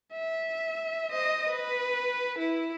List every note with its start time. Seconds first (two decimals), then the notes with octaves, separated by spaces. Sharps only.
0.13 E5
1.12 C5 D#5
1.49 B4
2.39 E4